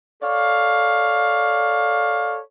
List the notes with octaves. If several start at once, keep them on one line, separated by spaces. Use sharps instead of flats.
A4 C#5 D5 F5